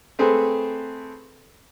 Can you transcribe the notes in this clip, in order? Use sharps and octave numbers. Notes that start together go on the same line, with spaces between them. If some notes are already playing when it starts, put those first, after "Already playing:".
A3 C4 G#4 A4 B4